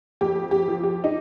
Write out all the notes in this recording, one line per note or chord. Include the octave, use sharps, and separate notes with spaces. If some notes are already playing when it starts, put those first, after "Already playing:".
F2 G4
G4
F3
G4
D#4